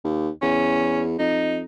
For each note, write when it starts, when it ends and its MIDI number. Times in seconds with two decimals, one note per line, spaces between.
0.04 0.29 39
0.42 1.14 40
0.42 1.02 61
1.19 1.63 41
1.19 1.60 63